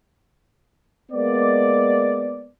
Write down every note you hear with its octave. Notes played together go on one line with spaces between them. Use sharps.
G#3 A#3 B3 D5